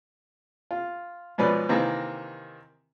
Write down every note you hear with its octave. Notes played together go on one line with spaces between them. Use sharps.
F4
G#2 B2 F3 C#4 B4 D5
C3 D#3 E3 A#3 C4